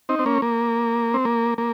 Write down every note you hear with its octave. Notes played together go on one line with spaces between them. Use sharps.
C4 D#4
C4
A#3 C#4
A#3
C4
A#3
A#3